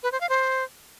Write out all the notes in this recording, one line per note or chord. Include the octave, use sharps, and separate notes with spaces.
B4
C5
F5
C5